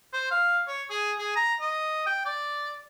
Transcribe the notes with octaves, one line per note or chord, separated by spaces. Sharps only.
C5
F5
C#5
G#4
G#4
A#5
D#5
G5
D5